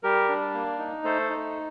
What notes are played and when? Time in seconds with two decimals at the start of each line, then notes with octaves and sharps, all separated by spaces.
0.03 G3 G4 A#4
0.28 D4
0.54 A#3
0.79 D#4
1.04 A3 A4 C5
1.30 D#4